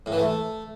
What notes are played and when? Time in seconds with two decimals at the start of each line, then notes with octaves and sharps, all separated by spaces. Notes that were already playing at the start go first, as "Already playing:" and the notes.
0.06 A2
0.12 E3
0.18 A3